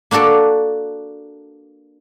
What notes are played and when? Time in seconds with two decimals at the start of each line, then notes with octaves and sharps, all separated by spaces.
0.11 A#3 D4 F#4 A4 D5